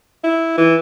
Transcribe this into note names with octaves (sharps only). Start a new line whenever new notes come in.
E4
E3